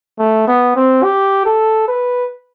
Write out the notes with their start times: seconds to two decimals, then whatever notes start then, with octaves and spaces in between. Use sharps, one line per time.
0.19 A3
0.48 B3
0.76 C4
1.03 G4
1.46 A4
1.88 B4